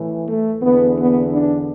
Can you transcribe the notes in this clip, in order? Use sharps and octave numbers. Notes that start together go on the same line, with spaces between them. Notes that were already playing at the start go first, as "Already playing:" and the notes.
Already playing: A2 E3
A3
E2 D3 B3
B3
D4